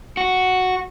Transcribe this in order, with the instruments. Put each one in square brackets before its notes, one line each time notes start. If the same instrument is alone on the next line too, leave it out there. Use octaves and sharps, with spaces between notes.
[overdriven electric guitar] F#4